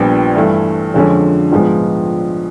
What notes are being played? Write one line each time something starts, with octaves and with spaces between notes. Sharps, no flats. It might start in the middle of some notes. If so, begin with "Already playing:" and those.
Already playing: A#1 A#2 G3 B3 D4
G2 E3 A3
F2 D3 F3 G#3 C#4
A#1 G#2 F3 G#3 B3